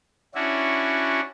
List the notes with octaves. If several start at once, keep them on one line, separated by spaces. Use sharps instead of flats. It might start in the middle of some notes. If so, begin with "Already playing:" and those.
C#4 D4 E4 F#4